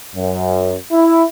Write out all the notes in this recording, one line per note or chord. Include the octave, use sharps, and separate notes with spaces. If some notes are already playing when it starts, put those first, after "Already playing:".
F#2
E4